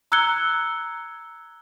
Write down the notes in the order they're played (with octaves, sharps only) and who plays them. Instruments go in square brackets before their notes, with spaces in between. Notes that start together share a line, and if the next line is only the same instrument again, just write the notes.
[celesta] A#5 E6 F#6 G#6 C#7 G7